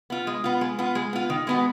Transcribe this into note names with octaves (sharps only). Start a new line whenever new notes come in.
B3 F4
G#3
B3 F4
G#3
B3 F4
G#3
B3 F4
D#3
G#3 B3 F#4